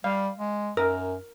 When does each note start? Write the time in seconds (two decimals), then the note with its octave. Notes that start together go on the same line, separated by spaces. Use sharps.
0.04 G3 F5
0.38 G#3
0.77 F#2 A#4